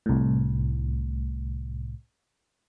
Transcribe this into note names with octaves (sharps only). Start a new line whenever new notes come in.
C2 A2